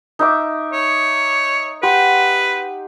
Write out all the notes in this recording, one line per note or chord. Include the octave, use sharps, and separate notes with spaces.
D#4 E5 D6
C#5
G4 B4 F#5 C6